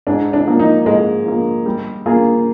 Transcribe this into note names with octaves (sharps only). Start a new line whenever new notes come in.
G#2 D4
D4
F3 A#3
D#4
G#2 G#3
F3 A#3
G3
A#3 F4 G#4